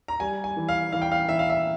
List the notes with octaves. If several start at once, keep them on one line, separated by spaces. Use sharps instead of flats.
A#5
G3 G#5
G#5
E3
F5
E3 F5
G5
F5
E3 E5
F5
E5